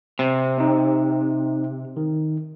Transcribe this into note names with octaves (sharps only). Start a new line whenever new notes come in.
C3
C4 D#4
D#3